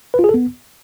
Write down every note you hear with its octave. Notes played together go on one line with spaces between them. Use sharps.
B4
F4
G#4
A4
B3